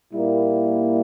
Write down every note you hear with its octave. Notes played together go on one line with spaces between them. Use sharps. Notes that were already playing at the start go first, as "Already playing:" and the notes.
A#2 G3 A#3 E4